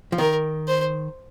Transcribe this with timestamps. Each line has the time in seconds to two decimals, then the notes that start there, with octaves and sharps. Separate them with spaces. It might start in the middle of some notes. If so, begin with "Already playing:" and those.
0.12 F3
0.18 D#3 A#4
0.68 C5